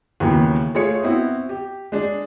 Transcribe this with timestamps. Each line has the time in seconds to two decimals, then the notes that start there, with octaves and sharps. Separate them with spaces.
0.20 D#2 C#3 E3 F#3 A#3 B3
0.75 A3 F4 G#4 C#5 C#7
1.02 B3 C4 E4 F#4
1.49 G4
1.92 G#3 D4